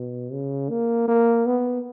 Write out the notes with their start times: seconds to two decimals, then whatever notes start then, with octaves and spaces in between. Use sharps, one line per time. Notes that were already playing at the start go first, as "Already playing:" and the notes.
Already playing: B2
0.33 C#3
0.70 A#3
1.08 A#3
1.46 B3